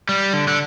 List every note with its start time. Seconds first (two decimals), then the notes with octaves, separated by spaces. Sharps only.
0.09 G3
0.33 D3
0.48 D3